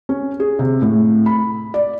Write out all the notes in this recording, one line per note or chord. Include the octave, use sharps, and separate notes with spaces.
C#4
G#4
C3
A2
B5
D5